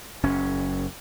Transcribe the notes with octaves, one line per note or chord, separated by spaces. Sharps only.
F#1 C#4